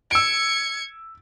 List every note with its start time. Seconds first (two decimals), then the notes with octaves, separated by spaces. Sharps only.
0.11 E6 G#6 C#7 D7